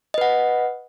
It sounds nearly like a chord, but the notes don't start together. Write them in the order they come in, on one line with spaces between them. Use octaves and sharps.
D#5 B4 F#5